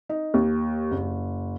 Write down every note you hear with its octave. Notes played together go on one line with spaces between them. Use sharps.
D#4
D#2
F#1